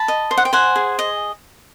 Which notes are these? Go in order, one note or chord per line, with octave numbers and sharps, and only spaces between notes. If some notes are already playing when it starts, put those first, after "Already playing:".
Already playing: A5 B5
D#5
C5
F#5
G5
C5 F#5 G#5
G#4
D#5